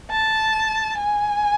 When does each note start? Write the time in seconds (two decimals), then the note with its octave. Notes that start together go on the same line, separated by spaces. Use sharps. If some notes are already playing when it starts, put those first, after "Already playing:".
0.11 A5
0.98 G#5